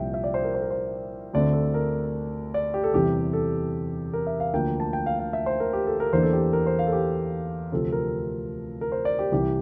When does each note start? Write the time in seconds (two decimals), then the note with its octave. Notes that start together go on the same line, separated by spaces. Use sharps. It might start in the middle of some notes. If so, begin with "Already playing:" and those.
Already playing: C2 A#2 F3 E5 G5
0.14 E5
0.24 D5
0.34 C5
0.44 A#4
0.54 C5
0.62 A#4
0.71 C5
1.33 D2 D3 A3 C4 D5
1.53 A4
1.74 A#4
2.54 D5
2.74 G4
2.84 A4
2.94 E2 C3 E3 G3 G4
3.33 A4
4.13 A#4
4.27 E5
4.40 F5
4.53 D2 D3 F3 A#3 G5
4.80 A5
4.93 G5
5.06 F5
5.19 F5
5.33 E5
5.46 C5
5.60 A#4
5.73 G4
5.87 A4
6.00 A#4
6.13 E2 E3 A#3 D4 C5
6.23 A4
6.33 G4
6.53 A#4
6.67 C5
6.79 F5
6.87 A4
6.93 G4
7.72 D2 C3 F3 C4 A4
7.92 A#4
8.81 A#4
8.92 C5
9.05 D5
9.19 G4
9.32 C2 C3 E3 G4